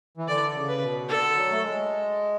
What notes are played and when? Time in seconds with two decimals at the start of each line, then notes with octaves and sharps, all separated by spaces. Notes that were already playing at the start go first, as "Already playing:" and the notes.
0.17 E3
0.27 D3 D5
0.55 C#3
0.68 B4
0.82 B2
1.09 D3 A4
1.36 F#3
1.52 A3
1.63 G#3